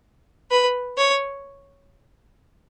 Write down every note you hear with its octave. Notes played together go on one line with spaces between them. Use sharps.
B4
C#5